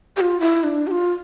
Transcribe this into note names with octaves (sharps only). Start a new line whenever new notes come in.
G4
F4
E4
D4
G4
F4